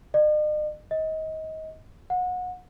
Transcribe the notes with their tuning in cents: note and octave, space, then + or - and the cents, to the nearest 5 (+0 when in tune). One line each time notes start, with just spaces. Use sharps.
D#5 -45
D#5 +25
F#5 -30